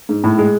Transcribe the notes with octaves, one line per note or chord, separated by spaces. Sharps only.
G#2
A2
G#3